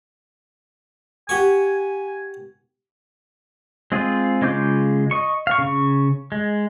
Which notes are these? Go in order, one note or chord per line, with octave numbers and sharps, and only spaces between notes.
G4 F#5 G#5 C#6
G#3 C4 F4 G#4
C#3 G#3 F4 D6 G6
D#5 C#6
F5 C#6
C#3 C#6
G#3